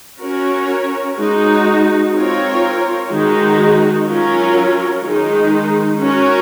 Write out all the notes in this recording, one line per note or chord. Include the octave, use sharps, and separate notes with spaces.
C#4 F#4 A#4 C#5
G#3 D#4 F#4
C4 F4 A#4 C#5
D#3 G#3 D#4 F#4
F#3 C#4 F4 A#4 C#5
D#3 G#3 D#4
C#4 F#4 A#4 C#5